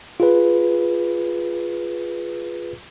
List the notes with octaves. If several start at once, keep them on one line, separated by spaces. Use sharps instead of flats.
F4 G#4 B4